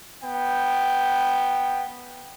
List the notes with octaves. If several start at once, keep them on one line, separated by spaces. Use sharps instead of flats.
B3 G5